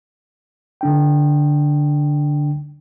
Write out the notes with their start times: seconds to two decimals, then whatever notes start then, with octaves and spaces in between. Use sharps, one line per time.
0.81 D3 D4 G5